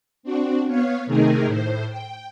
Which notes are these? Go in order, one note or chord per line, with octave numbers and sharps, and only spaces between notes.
C4 D4 F#4
B3 C#5 F5
C3 D#3 A3 D#4 G#4 A#4
A2 C5
G5